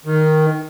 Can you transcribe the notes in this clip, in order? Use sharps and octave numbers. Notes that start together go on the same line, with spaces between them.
D#3